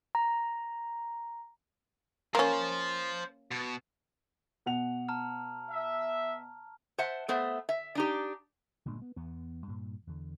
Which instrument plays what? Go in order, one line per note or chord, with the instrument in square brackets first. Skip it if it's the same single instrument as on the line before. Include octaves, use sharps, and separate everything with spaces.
[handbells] A#5
[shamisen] A#3 C#4 [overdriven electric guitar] C5 F5
[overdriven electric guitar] B2
[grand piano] B2 F#5 F7
[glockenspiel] A5 A#5 F6
[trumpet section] E5
[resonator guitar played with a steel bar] C5 E5 F#5 A5
A3 B3 C5 E5
E5
D4 D#4 G4
[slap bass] G1 A#2 G#3 D4
B3
E2 B3
G2 A#2
E2 D3